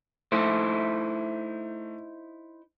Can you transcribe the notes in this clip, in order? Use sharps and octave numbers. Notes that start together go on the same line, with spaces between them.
A3 D#4 E4 C5